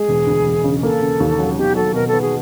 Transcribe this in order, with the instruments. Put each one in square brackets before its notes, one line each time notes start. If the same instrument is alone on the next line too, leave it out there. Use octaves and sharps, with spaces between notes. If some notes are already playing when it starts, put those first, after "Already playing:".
Already playing: [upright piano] G#3 [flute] G#4
[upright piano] E1
D2
E1
C#3
[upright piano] A#3 [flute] A4
[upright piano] C#3
D#2
F#3
[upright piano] B2 [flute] G4
[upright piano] F#3 [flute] A4
[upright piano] B2 [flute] A#4
[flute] A4
[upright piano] B3
[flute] G#4